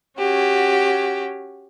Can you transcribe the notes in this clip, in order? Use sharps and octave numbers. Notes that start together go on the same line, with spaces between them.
C#4 F#4 G4